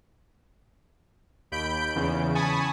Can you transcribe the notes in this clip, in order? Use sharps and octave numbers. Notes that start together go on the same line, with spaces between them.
D#2 B5 G6 D7
E2 C#3
G#5 A5 B5 C#6 D#6